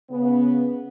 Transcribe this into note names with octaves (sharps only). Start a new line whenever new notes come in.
C#3 B3